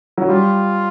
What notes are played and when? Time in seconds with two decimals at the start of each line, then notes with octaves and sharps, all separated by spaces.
0.17 F#3
0.29 G3 F4